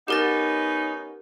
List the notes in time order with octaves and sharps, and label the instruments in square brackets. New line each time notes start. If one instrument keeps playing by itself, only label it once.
[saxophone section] B3 C#4 D#4 [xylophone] G4 A#4 A6